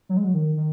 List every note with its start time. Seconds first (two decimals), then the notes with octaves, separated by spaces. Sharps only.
0.09 F#3
0.17 G#3
0.24 F#3
0.34 D#3
0.57 D#3